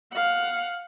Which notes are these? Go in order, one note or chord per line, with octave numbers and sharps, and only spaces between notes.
F5 F#5